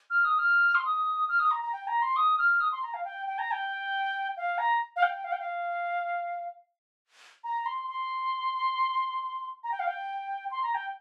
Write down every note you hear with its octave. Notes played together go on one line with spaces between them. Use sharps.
F6
D#6
F6
C6
D#6
F6
D#6
A#5
A#5
G5
A#5
C6
D#6
F6
D#6
C6
A#5
F5
G5
G5
A#5
G5
F5
A#5
F5
G5
F5
G5
F5
A#5
C6
C6
A#5
G5
F5
G5
C6
A#5
G5